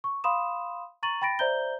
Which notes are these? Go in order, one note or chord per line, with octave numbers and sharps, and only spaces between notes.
C#6
F5 B5 C6 D#6 E7
A#5 C#6 A6 D#7 F#7
G5 B5 A6 A#6 D7
C5 D5 E5 A#5 G6 G7